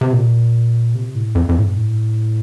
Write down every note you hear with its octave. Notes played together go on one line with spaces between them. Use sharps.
C3
A#2
C3
A2
F2
F2
A2
G2
A2